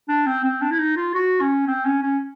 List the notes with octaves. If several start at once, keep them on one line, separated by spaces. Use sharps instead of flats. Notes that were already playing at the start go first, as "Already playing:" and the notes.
D4
C4
C4
D4
E4
D#4
F4
F#4
C#4
C4
C#4
C#4